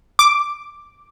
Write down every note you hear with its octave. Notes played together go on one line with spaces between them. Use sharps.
D6